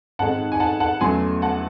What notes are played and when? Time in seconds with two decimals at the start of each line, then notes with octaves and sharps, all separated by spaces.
0.19 G#2 D#3 G#3 C4 F#5 A5
0.52 G#5
0.60 F#5 A5
0.80 F#5 A5
1.01 E2 C#3 F#3 A3 G#5 C6
1.42 F#5 A5